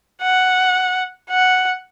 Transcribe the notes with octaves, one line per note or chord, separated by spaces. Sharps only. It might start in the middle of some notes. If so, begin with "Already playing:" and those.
F#5
F#5